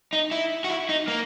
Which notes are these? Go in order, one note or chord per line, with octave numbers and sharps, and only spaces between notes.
D#4
E4
F#4
E4
D#4
A#3